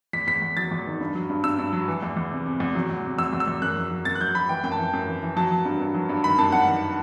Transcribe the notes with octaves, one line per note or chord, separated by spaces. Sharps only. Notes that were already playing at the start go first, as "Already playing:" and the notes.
E2 B6
E2 B6
E2
F#3 A6
E2
D#3
G2
F#3
G2
G2 E6
G2
F#3
E3
E2
E2
C3
C3
E2
F#3
E2
C3
E2 E6
E2
E6
E2
F#2 F#6
F#3
F#3
F#2 A6
F#6
F#3 G6
F#3 B5
E3 G5
F#2 G5
A5
E3
F#2
E3
E3
F#3 A5
F#3
G2
G2
F#3
G2
D#3 B5
F#2 A5
F#2 F#5
D#3